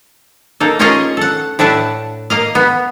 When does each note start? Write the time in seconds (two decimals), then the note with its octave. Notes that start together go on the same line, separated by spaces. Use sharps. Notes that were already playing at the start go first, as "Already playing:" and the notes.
0.60 A#3 D#4 A4
0.79 A#3 C#4 F4 G#4 C#5 D#5
1.17 A4 F#5
1.59 A2 D4 E5 F#5 A5
2.30 A#3 D#5 F5
2.55 B3